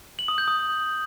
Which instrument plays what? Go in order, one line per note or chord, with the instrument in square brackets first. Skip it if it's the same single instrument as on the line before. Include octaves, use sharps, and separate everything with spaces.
[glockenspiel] F#7
D#6
G6
D#6